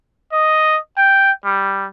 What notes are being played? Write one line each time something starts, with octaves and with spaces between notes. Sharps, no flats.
D#5
G5
G3